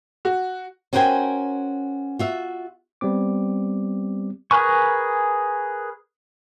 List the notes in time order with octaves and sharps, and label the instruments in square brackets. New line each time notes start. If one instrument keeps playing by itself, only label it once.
[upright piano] F#4
[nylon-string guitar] C#4 F#4 A#4 C5 G5 G#5
F4 F#4 E5
[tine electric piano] G3 B3 C4 D6
[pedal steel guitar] G#4 A#4 B4 G#5 C#6